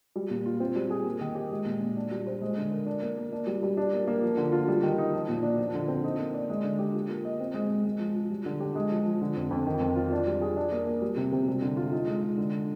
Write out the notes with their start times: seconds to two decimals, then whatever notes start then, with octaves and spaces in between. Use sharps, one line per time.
0.16 G3
0.30 A#2
0.46 F4
0.60 C4
0.75 G3
0.90 G#4
1.06 A#3
1.21 D#3
1.35 G4
1.51 G#3
1.65 A#2
1.81 A#2
1.97 D4
2.11 G3
2.27 C5
2.42 G#3
2.57 D3
2.72 A#4
2.86 D4
3.02 A#3
3.17 A#3
3.33 D4
3.46 G3
3.63 G3
3.77 D4
3.93 A#3
4.08 A#3
4.22 F3
4.37 D3
4.52 F4
4.68 G3
4.83 D#3
4.98 D#4
5.13 F3
5.29 A#2
5.43 D4
5.58 F3
5.74 D3
5.88 C4
6.04 D#4
6.19 A#3
6.34 D5
6.50 G#3
6.64 D3
6.79 G4
6.94 F4
7.10 A#3
7.25 D#5
7.40 C4
7.54 G#3
7.70 G#3
7.85 G#3
7.99 F3
8.15 F3
8.30 G3
8.45 D3
8.60 G4
8.75 G#3
8.91 F3
9.05 F3
9.21 D3
9.36 F2
9.51 F2
9.67 D#3
9.81 F2
9.96 F4
10.12 D4
10.27 G3
10.41 G#4
10.57 D4
10.72 A#3
10.86 A#3
11.01 G3
11.17 C3
11.32 C3
11.47 G3
11.62 D3
11.77 F4
11.92 D#4
12.07 G#3
12.22 G#3
12.37 D3